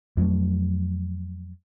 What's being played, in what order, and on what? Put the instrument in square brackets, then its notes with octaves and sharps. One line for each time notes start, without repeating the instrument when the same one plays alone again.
[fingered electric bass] F2 F#3 A3